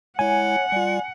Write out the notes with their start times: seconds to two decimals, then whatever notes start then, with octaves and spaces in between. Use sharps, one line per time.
0.19 G#3 E4 C#5 F#5 G#5
0.72 G3 F4 D5